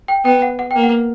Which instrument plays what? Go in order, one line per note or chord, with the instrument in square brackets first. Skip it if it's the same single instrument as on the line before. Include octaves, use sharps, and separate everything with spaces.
[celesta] G5
[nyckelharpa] B3 [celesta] G5
[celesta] F#5
F#5
[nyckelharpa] A#3 [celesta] G5
[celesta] F#5